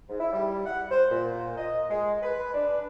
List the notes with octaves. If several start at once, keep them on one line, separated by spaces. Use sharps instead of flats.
G#2
E4
G3
F#5
C5
A#2
D#5
G#3
B4
D4